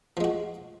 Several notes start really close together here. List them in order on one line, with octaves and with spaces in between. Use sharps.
F3 G#3 F#4